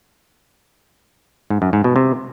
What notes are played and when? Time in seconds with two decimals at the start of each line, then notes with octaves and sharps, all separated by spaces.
1.50 G#2
1.62 F#2
1.73 G#2
1.84 B2
1.96 C3